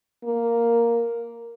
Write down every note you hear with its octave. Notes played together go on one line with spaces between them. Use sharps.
A#3